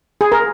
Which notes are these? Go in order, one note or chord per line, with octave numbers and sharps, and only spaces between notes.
G#4
A#4